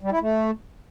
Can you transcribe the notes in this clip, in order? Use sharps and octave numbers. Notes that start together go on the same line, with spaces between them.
G3
E4
A3